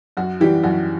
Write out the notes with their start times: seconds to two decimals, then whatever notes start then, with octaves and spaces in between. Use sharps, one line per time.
0.17 F#2 F#4
0.40 E3 G3 G4
0.63 F#2 F#4